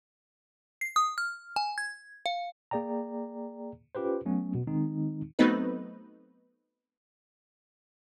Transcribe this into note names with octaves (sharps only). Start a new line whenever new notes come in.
C7
D#6
F6
G#5
G#6
F5
A#3 G#4 D5 G5 A#5
C#4 F4 G4 B4 C5
F#3 A3 B3 C#4
B2
D#3 G#3 C4 D#4
F#3 A3 B3 C4 D#4 B4